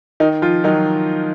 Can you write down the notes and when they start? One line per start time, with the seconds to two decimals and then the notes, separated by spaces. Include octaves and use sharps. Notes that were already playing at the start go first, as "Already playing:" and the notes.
0.20 D#3 D#4
0.42 F3 F4
0.64 D#3 F#3 D#4